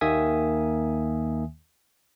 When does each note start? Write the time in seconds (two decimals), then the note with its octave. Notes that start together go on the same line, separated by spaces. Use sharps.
0.01 D#2 D#3 A#3 E5 G#5 D#6